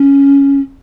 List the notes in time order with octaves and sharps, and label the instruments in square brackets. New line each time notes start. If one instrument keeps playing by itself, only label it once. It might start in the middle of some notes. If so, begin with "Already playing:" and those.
Already playing: [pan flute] C#4